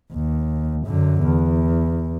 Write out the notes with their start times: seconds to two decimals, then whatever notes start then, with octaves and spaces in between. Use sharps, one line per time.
0.13 D#2
0.87 F#2 D3
1.22 E2